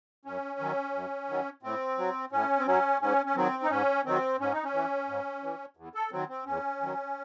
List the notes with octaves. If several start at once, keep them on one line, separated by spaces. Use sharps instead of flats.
F#2 C#4
D#3 F#3
F#2
D#3 F#3
A2 C4
F#3
A2 C#4
C4
F#3 C#4
G#2 C#4
C#4
D#3 F#3 C4
D#4
G#2 C#4
D#3 F#3 C4
G#2 C#4
D#4
C#4
E3
G#2
E3
E2
A4
D#3 F#3 C4
C4
E2 C#4
D#3 F#3